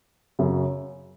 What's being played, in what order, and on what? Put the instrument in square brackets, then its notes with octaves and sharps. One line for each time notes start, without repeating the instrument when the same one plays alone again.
[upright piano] F#2 C#3 F#3